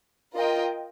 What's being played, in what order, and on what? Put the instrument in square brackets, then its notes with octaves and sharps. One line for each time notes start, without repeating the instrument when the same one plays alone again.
[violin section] F4 A#4 D#5 G5